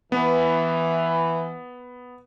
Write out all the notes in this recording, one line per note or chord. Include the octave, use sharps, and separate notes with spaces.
E3 B3